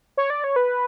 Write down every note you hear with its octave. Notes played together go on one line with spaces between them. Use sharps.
C#5
D5
C#5
B4